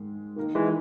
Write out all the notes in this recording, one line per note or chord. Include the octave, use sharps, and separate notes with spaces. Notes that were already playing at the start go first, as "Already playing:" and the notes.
Already playing: G#2 D#3 G#3
D#3 A#3 D#4 A#4
E3 G#3